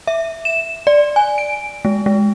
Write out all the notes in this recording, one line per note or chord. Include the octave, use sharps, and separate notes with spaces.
E5
E7
D5
G#5
D7
G#3
G#3